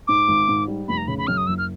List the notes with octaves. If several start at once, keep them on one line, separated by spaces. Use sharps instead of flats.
G#2 D6
G#1
G#2
G3
F1 B5
A#5
C#3 B5
B5
F#2 F6
D#6
F#1 E6
F6